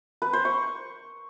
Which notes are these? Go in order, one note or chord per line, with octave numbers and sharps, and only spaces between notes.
B4
C5
C#6